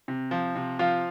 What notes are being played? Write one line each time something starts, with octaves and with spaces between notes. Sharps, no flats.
C3
F3
C3
F3 F4 F5